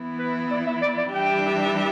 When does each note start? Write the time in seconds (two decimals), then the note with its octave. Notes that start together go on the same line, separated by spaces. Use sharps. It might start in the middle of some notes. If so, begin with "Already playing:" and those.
Already playing: E3 B3 E4
0.19 B4
0.51 D5
0.66 E5
0.82 D5
0.97 D5
1.13 E3 G3 D4 G4 E5 G5